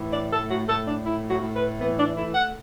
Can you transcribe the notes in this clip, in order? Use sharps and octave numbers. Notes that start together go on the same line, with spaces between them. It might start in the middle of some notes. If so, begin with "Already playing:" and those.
Already playing: A2 E3
D5
A3 A4
F#4
A2 A4
D4
A3 E4
F#4
A2
B4
E3 B3
D4
A3 E4
F#5